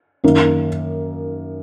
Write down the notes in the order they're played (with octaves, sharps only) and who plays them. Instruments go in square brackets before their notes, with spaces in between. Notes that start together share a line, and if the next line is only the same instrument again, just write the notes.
[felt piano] F#2 D#3 A#3